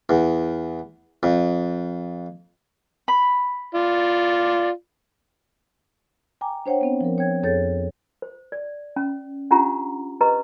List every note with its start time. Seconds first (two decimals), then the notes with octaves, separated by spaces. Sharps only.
0.09 E2
1.23 F2
3.08 B5
3.75 F4 D5
6.41 G5 G#5 A#5 D6
6.66 D4 C5 C#5 F#5 G5
6.81 B3 C4 D4
7.01 F3 A#4
7.18 C#5 G5 G#6
7.43 F2 G#4 A4 C#5 G6 A6
8.22 C5
8.52 D5
8.96 C#4
9.51 C#4 D4 F4 G4 F#5 A#5
10.21 G4 B4 C5 D#5 A#5